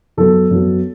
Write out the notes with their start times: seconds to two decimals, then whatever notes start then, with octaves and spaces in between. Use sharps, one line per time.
0.17 F#2 F#3 B3 A4
0.51 F#2 F#3 B3